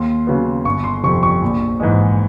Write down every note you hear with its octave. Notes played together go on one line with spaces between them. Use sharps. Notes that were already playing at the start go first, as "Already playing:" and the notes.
Already playing: D#2 C6
C#3 F#3 B3
G1 C#6
C6
F2 C3 C#6
C#6
A#1
G#2 E3 G#3